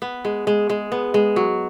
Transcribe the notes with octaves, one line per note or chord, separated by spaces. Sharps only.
B3
G#3
G#3
G#3
B3
G#3
F#3